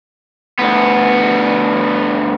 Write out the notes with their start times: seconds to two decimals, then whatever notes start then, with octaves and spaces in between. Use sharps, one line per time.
0.59 D2 B3